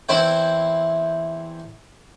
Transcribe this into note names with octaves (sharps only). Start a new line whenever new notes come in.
E2 C4 E4 C5 G5